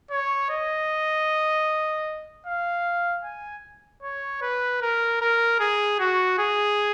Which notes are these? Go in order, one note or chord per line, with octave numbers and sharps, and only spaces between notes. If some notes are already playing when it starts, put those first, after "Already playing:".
C#5
D#5
F5
G#5
C#5
B4
A#4
A#4
G#4
F#4
G#4